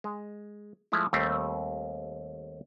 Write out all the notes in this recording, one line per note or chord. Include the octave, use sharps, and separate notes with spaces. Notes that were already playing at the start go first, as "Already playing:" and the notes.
G#3
F3 G#3 A3 E4
D#2 G3 A3 C4